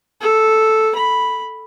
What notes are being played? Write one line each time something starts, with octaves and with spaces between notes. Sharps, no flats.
A4
B5